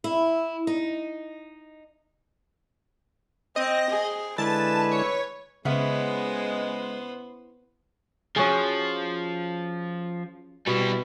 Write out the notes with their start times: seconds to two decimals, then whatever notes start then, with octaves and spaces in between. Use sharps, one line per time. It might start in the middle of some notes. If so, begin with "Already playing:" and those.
0.04 E4
0.67 D#4
3.56 C4 D#5
3.90 G#4
4.38 D3 G#3 E4 B4 A5
4.92 C#5
5.65 C#3 G#3 B3 C#4 E4 C5 F#5
8.36 F3 C#4 F#4 G#4
10.67 B2 G3 E4